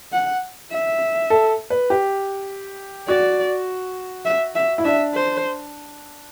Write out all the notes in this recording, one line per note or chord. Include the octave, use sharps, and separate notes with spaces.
F#5
E5
A4
B4
G4
F#4 D5
E5
E5
E4
D4 E5
C5